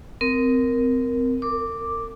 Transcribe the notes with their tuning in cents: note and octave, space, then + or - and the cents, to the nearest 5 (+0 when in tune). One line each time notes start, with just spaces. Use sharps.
C4 -25 A#4 +0
A#4 -40 D6 +0